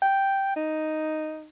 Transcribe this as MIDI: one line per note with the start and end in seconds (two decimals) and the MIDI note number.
0.02 0.53 79
0.56 1.48 63